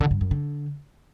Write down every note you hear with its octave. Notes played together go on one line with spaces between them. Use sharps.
D3
G2
F#2
D3